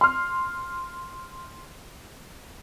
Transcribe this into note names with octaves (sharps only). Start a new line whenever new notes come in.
C6 F6